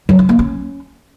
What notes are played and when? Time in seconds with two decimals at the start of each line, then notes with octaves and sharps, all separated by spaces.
0.09 F#3
0.19 D#4
0.29 A#3
0.39 C#4